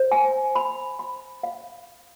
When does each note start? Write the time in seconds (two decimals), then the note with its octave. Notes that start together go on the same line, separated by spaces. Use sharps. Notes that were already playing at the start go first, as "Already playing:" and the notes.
Already playing: C5
0.12 G#5
0.55 B5
0.99 B5
1.43 F5